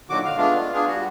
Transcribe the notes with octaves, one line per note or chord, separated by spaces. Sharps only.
A#2 D3 D#3 F#3 F#4 D6
F5
G#3 A3 B3 D4 F4
F4
B3 D4 F4 G#4
G3 F#4